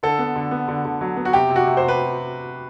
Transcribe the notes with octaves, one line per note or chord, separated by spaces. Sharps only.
D3 A4
B3
D3
B3
D3
D3
F#3
B3
F#4
C3 G4
C3
F#4
C3
C5
C3
B4